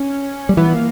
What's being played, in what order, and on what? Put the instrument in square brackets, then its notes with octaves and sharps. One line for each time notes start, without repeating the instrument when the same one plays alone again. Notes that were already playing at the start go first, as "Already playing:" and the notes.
Already playing: [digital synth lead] C#4
[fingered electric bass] G3
[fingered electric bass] E3 [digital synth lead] B3
[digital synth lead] A#3